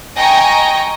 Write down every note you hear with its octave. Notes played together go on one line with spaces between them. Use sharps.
D#5 G5 G#5 A#5 C#6 A#6